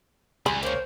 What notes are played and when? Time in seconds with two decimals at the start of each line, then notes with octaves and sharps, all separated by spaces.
0.46 C#2 G3 G#5 B5
0.63 A#3 C5 C#5